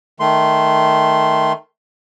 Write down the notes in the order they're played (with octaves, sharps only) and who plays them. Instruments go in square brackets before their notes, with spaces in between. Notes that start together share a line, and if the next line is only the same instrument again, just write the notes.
[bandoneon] D#3 A3 C6